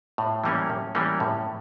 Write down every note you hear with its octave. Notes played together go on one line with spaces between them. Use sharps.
A2
E3 G3 A#3 C#4
A2
E3 G3 A#3 C#4
A2